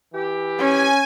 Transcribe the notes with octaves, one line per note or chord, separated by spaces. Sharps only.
E3 G4
C#4 G#5